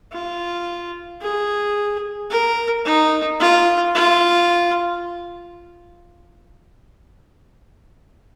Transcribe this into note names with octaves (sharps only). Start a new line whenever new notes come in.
F4
G#4
A#4
D#4
F4
F4